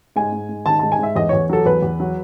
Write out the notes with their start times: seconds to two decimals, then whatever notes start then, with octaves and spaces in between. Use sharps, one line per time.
0.16 G#2 G#5
0.32 G#2
0.49 G#2
0.66 D#3 A5
0.79 G#2 A5
0.92 G#5
0.99 G#2 E5
1.16 E2 D#5
1.29 E2 C#5
1.50 F#3 A4
1.65 E2 B4
1.83 E2
2.00 F#3